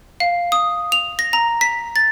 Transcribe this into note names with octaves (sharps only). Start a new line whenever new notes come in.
F5
D#6
F7
A#6
A#5
B6
A6